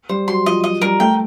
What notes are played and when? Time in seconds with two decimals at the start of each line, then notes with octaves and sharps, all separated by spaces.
0.09 G3 C5
0.27 F#3 C6
0.46 F3 D#5
0.64 D#5
0.81 G3 A#4
1.00 A3 G5